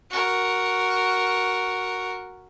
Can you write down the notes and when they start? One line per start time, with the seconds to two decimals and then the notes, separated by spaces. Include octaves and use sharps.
0.11 F#4 A#4